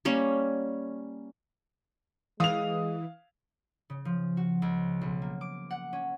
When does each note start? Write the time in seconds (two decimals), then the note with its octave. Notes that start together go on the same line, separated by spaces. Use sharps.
0.05 G3 A#3 C#4
2.40 E3 G#3 F5 D#6 F7
3.90 C#3
4.05 F3
4.37 F#4
4.62 C#2
5.01 B1
5.22 A#3
5.41 D6
5.71 F#5
5.93 C#4